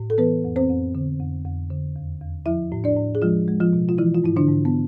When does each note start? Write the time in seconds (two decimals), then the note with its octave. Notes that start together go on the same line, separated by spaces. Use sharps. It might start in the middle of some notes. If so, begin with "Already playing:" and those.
Already playing: A2
0.10 A4
0.18 E3 B3 B4
0.44 F2
0.56 C4 C5
0.69 F2
0.95 D3
1.20 F2
1.45 F2
1.70 D3
1.96 E2
2.21 E2
2.46 F3 E4 E5
2.72 A2
2.84 D4 D5
2.97 A2
3.15 G#4
3.22 F3 G#3 F4
3.48 G#3
3.60 F3 F4
3.73 B2
3.89 F4
3.98 E3 F3 E4
4.15 F4
4.24 G#2 E4
4.36 D3 D4
4.48 G#2
4.65 B3